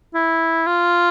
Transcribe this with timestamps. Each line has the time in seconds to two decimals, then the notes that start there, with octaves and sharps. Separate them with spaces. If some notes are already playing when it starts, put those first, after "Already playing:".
0.14 E4
0.67 F4